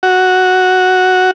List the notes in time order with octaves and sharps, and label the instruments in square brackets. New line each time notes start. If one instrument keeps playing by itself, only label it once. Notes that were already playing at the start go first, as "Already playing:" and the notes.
[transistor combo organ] F#4